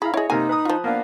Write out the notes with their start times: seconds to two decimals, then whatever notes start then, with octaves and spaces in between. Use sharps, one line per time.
0.02 E4 G#4 F5 A#5 B5
0.14 E4 G#4 C#5 D#5
0.30 C3 A#3 D#4 G#5 A#5
0.49 B4 A#5 D#6
0.65 F3 F4
0.84 A#3 B3 D4 F5